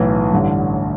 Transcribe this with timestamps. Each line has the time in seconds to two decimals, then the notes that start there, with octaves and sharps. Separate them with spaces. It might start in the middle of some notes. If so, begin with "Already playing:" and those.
Already playing: B1 A2 E3
0.33 A1 G2 D3